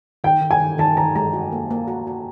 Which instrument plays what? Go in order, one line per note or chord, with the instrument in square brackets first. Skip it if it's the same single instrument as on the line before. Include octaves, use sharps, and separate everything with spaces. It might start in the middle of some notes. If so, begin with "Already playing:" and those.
[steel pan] D#3 [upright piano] G5
[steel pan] D#3
[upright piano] G#5
[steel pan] D#3
[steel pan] D#3 [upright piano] A5
[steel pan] D#3 [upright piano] A#5
[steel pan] G#3 [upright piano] A#5
[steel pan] F#4
A#3
A#3
F#4
F#4